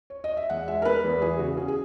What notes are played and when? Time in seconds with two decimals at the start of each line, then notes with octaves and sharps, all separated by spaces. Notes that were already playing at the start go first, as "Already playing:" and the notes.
0.10 C#5
0.24 D#5
0.37 E5
0.50 E2 F#5
0.68 G#3 E5
0.82 A#4
0.85 B3 B4
1.04 E2
1.22 E3 G#4
1.39 C#3 F#4
1.57 C#4 G#4
1.68 G#4